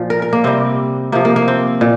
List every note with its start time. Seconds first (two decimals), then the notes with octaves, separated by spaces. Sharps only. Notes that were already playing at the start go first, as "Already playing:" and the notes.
Already playing: A#2 F3 F4
0.10 A#4
0.22 A#4
0.33 A#3
0.44 C3 G3 C4
1.12 C3 F3 A#3
1.25 A#3
1.36 A#3
1.48 C4
1.81 A#2